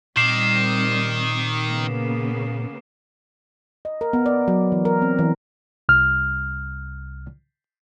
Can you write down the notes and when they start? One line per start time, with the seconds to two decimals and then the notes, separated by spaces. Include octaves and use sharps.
0.17 A#2 D#3 G3 C4 D6 C7 E7
1.67 C#3 A#3 B3
3.85 D#5
4.01 A#4
4.13 B3
4.26 D5
4.48 F#3
4.72 E3
4.85 A#4
5.02 C4
5.19 E3
5.89 C2 F6